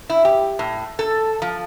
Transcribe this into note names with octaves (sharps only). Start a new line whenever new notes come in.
E4
G4
A2
A4
F3